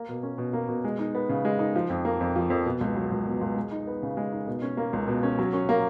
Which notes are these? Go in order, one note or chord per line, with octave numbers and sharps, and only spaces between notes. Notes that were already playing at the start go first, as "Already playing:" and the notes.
Already playing: A#3
B2
C#4
B2
A#3
B2
G#3
D#4
B3
C#3
G#3
D#4
F3
F2
A#3
F2
F3
F2
B2
C#2
F#3
C#2
B2
C#2
G#3
D#4
B3
C#3
G#3
D#4
B2
C#4
A#3
C#2
B2
C#4
F#3
C#4
A#3